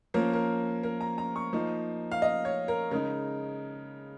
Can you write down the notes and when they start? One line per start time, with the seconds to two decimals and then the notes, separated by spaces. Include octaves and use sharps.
0.14 F3 A#3 C#4 A#4
0.33 A#4
0.83 A#4
1.01 A#5
1.18 A#5
1.36 C#6
1.53 F3 A#3 D#4
2.12 F5
2.22 D#5
2.45 C#5
2.68 A#4
2.91 C#3 G#3 D#4 A#4